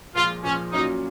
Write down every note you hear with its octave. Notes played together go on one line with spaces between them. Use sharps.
A#2 F3 G#3 F4
A#2 F3 G#3 C#4
A#2 F#3 A#3 C#4 D#4 F4